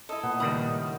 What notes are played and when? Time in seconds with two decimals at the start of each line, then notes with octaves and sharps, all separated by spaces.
0.09 E4 A4 D#5
0.23 A#2 B3
0.40 C#2 D#3 G3 B5 D#6